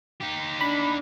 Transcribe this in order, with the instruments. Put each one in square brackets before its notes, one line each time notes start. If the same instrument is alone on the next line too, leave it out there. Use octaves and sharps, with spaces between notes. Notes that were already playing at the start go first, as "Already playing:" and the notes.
[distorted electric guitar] D#4 G4
[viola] D4 [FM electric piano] B5